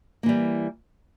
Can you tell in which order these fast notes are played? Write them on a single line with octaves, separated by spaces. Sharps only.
A#3 E3 G3